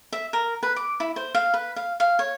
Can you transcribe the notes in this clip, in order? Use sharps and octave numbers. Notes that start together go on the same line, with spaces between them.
E5
A#4
B4
D6
E4
C5
F5
B4
F5
F5
C#5